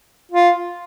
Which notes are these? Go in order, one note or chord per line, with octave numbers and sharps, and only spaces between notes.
F4